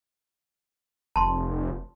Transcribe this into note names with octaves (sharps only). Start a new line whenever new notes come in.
F1 A5 C6